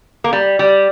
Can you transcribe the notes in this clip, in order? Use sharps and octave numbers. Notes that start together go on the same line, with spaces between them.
A#3
G3
G3